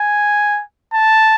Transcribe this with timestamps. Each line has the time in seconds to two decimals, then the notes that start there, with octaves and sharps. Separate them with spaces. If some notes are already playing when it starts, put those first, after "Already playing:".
Already playing: G#5
0.94 A5